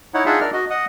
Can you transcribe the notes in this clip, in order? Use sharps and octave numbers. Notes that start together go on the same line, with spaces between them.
D#4 E4 C#5 F#5
D4 D#4 F4 G#4 E5 F#5
D4 A#4 D5 F6
F#4 D#5
D#5 F#5 D#6